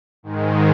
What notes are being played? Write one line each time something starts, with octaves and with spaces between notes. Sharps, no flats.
G#2 D#3 G#3